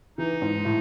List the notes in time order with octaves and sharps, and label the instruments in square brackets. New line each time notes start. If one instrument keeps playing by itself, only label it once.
[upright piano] E3 [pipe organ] D#4
[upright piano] G#2
A2